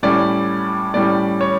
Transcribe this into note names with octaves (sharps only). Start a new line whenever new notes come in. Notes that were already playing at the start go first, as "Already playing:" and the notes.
A2 G3 C#4 D5
A2 G3 C#4 D5
C#5